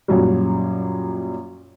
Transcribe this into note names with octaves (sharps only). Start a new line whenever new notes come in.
F#2 A#2 F#3 G3